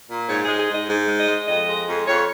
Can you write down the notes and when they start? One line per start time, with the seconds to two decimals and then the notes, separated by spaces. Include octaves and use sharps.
0.09 A#2
0.28 G#2 C#5
0.44 G#3 G#4
0.59 G#4
0.69 G#2 D#5
0.88 G#2
1.08 G#3
1.18 D#5
1.28 G#3
1.47 F2 D#5
1.68 G#3
1.87 F2
2.07 F2 C#5